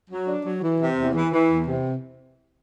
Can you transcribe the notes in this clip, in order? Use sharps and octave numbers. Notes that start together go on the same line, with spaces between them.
F#3
D4
F#3
E3
C3
E2
E3
E3
E2
C3